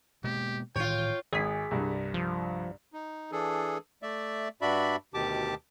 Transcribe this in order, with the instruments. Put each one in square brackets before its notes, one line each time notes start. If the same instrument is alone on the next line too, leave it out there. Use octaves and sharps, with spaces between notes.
[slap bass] B2 G#3 A#3 [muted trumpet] G4
[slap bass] A2 D#3 E3 [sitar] F4 C#5 [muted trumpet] G5
[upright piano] G#1 B6 [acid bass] G#4
[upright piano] C2 G2
[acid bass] F3
[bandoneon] D#4
E3 D4 G#4 A4
A3 D5 E5
G2 D4 F#4 D5 E5 B5
D2 B2 D#3 G4 A5 D6